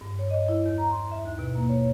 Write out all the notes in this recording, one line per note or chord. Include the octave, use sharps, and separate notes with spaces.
G2
C#5
D#5
E4
E2
A#5
C6
E5
D#2
B2
A#3
C#5